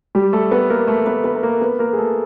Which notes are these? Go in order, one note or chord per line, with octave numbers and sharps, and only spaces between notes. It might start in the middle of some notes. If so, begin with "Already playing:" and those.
G3 G4
A3 A4
B3 B4
A#3 A#4
A3 A4
B3 B4
B3 B4
B4
A#3 A#4
B3 B4
A#3 A#4
G#4
A3 A4